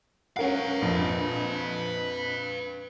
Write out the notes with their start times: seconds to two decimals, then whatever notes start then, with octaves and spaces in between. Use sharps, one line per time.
0.37 C#4 A#4 B4 F5 F#5
0.82 A#1 F2